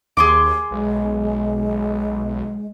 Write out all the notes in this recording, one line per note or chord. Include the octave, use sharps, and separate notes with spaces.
D#2 G#4 C6 D6
B1 G#3